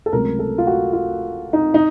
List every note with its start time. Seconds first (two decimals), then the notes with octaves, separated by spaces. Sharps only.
0.06 A4
0.12 C#2 C3 F#3 A3 A#4
0.39 A4
0.58 F4
0.67 F#4
0.93 F4
1.53 D#4
1.74 D#4